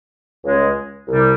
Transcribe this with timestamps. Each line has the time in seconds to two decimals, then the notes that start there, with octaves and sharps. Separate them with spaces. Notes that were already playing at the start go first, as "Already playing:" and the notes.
0.44 C#2 C#3 G#3
1.08 C2 C3 G3